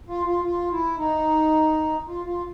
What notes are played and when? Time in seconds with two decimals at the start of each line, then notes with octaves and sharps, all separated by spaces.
0.08 F4
0.26 F4
0.44 F4
0.71 E4
0.98 D#4
2.08 F4
2.25 F4